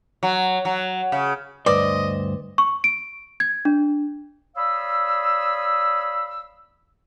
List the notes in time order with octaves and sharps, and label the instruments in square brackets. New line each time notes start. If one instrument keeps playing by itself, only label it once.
[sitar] F#3
F#3
C#3
[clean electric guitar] D2 G2 C5 [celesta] B4 [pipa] D5 [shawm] D#5
[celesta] C#6
D7
G#6
D4
[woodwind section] C#5 D5 F5 B5 D#6 E6